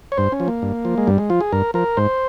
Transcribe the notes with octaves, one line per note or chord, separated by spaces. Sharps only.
C#5
G2 C5
C#4
F3
A#3
G2
F3
G#3
G2 G3
G#3
F3 F4
G#4
G2 A#4
F3 A#4
G#2 C5